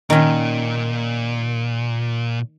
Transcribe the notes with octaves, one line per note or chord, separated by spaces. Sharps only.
A#2 D#3 C#4